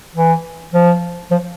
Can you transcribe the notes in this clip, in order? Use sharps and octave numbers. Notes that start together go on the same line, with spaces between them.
E3
F3
F3